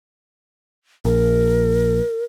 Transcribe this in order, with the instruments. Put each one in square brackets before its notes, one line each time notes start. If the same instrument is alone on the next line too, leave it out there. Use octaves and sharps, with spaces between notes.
[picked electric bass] A#1 [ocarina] A#4